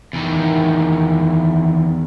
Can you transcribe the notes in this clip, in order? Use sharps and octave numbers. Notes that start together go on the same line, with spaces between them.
E2 D#3